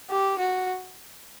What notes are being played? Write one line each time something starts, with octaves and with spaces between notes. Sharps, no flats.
G4
F#4